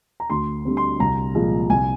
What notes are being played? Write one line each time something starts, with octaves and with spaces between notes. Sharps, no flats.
A#5
D2 C6
D3 G3 C4
C6
C2 A#5
A#2 F3 G#3
C2 G#5